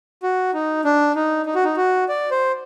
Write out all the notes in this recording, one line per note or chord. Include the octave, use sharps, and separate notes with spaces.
F#4
D#4
D4
D#4
D#4
F#4
D#4
F#4
D5
C5